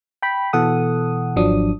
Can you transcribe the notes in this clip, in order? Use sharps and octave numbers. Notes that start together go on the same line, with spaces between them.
G5 B5
B2 E3 A4 F#5 D#6
G#1 F3 F#3 D4 D#6